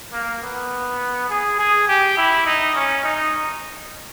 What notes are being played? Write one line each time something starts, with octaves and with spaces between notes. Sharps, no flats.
A#3
B3
G#4
G#4
G4
E4
D#4
C#4
D#4